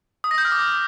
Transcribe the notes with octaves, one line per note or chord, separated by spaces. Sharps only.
D#6
A#6
G6
F6
D6